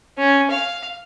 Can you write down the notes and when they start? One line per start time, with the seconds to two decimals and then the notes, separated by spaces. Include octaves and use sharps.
0.18 C#4
0.51 F5